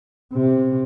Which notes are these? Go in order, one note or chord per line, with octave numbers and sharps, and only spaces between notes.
C3